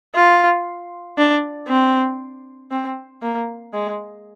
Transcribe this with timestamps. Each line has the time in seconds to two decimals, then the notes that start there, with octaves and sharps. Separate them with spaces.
0.15 F4
1.17 D4
1.68 C4
2.71 C4
3.22 A#3
3.73 G#3